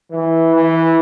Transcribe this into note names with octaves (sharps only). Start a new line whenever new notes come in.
E3
E3